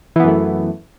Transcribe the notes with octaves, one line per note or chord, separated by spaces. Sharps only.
F#2 E3 A3 B3